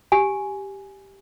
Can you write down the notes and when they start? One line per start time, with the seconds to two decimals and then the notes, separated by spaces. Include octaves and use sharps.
0.12 G4 G#5